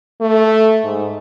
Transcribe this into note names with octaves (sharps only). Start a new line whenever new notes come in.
A3
G#2